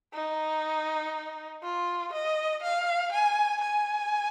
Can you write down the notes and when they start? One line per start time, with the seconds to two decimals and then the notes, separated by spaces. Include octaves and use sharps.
0.14 D#4
1.63 F4
2.12 D#5
2.63 F5
3.12 G#5
3.62 G#5